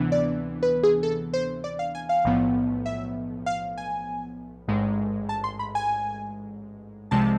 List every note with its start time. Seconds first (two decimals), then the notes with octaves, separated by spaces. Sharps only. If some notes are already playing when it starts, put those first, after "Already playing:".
Already playing: D2 C3 E3 B3 D4
0.12 D5
0.63 B4
0.83 G#4
1.03 A4
1.33 C5
1.64 D5
1.79 F5
1.95 G#5
2.09 F5
2.25 B1 A2 F3 B3
2.86 E5
3.46 F5
3.77 G#5
4.68 A1 G#2 G#3
5.29 A5
5.44 C6
5.59 B5
5.75 G#5
7.11 C2 C3 F3 G#3 A5